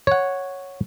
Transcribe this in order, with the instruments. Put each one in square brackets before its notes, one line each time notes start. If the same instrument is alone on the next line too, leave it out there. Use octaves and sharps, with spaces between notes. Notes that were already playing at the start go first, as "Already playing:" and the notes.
[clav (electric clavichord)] C#5 F#5